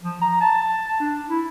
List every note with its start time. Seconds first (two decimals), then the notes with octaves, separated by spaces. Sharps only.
0.03 F3
0.21 A#5
0.41 A5
1.00 D4
1.29 E4